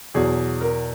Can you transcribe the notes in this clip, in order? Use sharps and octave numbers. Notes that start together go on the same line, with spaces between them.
E2 B2 F#3 G#4
A#4